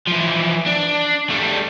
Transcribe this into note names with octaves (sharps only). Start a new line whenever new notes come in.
E3 F3
D4
G3 A3